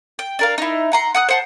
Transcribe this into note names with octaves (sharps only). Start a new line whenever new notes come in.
G5
D4 A#4 F5
D#4 E4
F#5 A#5 C6
F#5 D#6 F#6
C5 F#5 A5